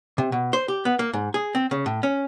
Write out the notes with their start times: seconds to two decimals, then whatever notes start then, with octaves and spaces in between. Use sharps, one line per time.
0.18 C3
0.32 B2
0.53 C5
0.68 G4
0.85 B3
0.99 A#3
1.13 G#2
1.34 G#4
1.55 C4
1.71 C#3
1.86 A2
2.03 C#4